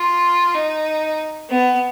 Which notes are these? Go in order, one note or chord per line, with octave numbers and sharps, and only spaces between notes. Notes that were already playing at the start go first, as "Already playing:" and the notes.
Already playing: F4
D#4
B3